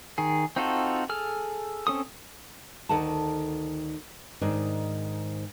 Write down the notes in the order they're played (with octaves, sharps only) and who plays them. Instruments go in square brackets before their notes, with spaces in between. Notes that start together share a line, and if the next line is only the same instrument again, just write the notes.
[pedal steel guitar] D#3 G#4
C4 D#4 F4 F#4 A4
G#4 A4 F6
C4 C#4 A4 D#6
[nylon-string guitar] D2 D#3 A4 F#5 A5
G#2 D#3 D4